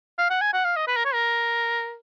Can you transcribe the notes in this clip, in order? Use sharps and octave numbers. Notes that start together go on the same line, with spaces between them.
F5
F#5
G#5
F#5
F5
D#5
B4
A#4
C#5
A#4